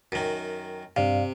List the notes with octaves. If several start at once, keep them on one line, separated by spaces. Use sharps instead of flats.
F#2 D#3
G2 C3 D5 F5